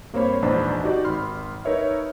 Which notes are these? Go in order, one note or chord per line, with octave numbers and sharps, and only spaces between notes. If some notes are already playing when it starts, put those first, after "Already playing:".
G2 A#3 C4 C5 C#5 B5
A#1 E2 G#2 D4 C5 B5
D#4 F#4 G4 D5
G#1 B5 C6 F6
D#4 A#4 B4 C#5 E5